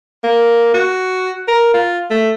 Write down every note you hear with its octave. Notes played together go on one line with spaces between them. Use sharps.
A#3
F#4
A#4
F4
A3